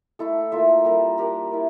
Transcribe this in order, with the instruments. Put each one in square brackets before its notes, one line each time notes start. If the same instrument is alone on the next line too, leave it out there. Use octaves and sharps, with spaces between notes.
[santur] A3 E4 A4
A#3 F4 A4 E5
G3 D4 G4 A#4
D4 G4 A#4
E4 A#4